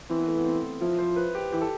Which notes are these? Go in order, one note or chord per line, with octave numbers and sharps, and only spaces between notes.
E3 C4
B3
A3
B3
C4
F3 E4
C5
B4
G4
E3 G4
A4